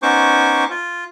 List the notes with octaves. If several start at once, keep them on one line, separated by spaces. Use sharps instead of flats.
B3 C#4 D#4 C5 C#6 D6
F4